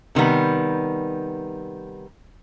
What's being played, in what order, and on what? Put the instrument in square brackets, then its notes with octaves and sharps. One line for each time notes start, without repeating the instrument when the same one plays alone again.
[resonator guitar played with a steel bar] C3 D#3 G3 B3